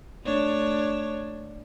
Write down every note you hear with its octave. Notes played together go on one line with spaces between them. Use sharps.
A3 D4 C#5